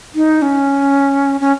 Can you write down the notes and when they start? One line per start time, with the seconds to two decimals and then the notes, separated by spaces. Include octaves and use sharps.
0.15 D#4
0.42 C#4
1.41 C#4